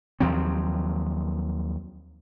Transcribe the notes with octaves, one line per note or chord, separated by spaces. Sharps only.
D#2 F3 F#3 C4